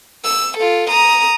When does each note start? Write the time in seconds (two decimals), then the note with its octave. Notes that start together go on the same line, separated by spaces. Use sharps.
0.24 E6
0.58 F4 A4
0.90 A#5 D#6